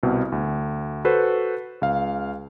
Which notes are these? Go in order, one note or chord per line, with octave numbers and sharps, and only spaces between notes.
C2 B2 C4
D2
F#4 A4 B4 C5
C#2 F5